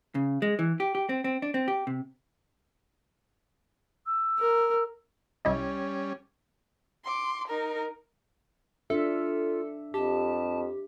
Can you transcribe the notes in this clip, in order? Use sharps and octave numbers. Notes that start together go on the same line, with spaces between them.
C#3
G#3
E3
G4
G4
C4
C4
D4
C4
G4
C3
E6
A#4
C2 G3 C#4 E4 D#5
C6 D6
D#4 A#4
D4 F4 A4 E5
F2 G4 A5